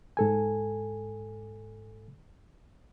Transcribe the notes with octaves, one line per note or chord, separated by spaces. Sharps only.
G#2 A4 G#5